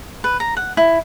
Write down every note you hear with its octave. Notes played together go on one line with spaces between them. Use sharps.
B4
A#5
F#5
E4